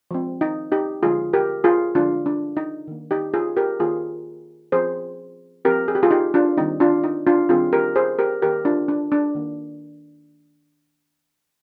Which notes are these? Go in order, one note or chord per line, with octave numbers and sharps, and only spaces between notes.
F3 G#3 C4
D#4
D#4 G4
D3 F3 G#3 F4 G#4
G4 A#4
F4 G#4
D3 F3 G#3 D4 F4
D4
D#4
D#3 A#3
D#4 G4
F4 G#4
G4 A#4
D#3 A#3 F4 G#4
F3 C4 G#4 C5
F3 C4 G4 A#4
G#4
G4
F4 G#4
D#4 G4
D4 F4
D#3 G3 C4 D#4
D4 F4
D#4
D4 F4
D#3 G3 C4 F4 G#4
G4 A#4
G#4 C5
G4 A#4
D#3 A#3 G4 A#4
D4 F4
D4
D4
D#3 A#3